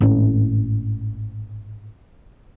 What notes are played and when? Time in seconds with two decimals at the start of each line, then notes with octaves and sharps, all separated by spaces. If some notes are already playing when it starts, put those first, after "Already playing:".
0.01 G#1 A2 C#4